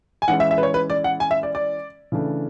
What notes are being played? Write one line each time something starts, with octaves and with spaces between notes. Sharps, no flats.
G#5
E3 G#3 C#4 F#5
E5
E5
B4
C#5
B4
D5
F#5
G#5
E5
D5
D5
C#3 E3 A3 D4